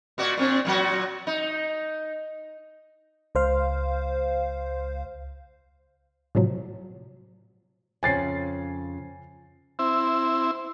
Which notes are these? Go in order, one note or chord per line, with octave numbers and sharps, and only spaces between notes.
A#2 F#4 D5
A#2 C4 D4
A#2 F#3 F#4
D#4
C#2 C5 F5
A2 C3 F3 F#3
F2 C#3 G#5 A6 C7
C4 E4